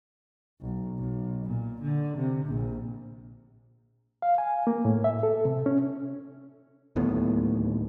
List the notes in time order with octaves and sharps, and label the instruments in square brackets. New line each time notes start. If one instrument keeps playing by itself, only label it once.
[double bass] B1
B1
A#2
D3
C3
A#1
[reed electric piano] F5
G#5
A#3
A2
E5
A4
C3
C#4
[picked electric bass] D1 D#2 A2 B3